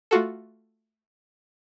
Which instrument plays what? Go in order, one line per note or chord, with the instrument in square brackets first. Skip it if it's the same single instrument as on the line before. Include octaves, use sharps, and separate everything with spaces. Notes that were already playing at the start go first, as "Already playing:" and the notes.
[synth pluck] A3 F4 F#4 A4